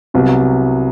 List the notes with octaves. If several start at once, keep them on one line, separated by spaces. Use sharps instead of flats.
C2 C3 F#3 B3